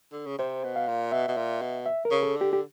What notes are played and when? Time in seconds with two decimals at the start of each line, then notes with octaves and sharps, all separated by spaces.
0.12 D3
0.26 C#3
0.38 C3 C5
0.63 B2
0.76 F5
0.88 A#2
1.12 B2 E5
1.28 B2
1.37 A#2
1.61 B2
1.86 E5
2.05 A#4
2.11 C#3
2.23 A4
2.36 D3
2.41 G4
2.53 G4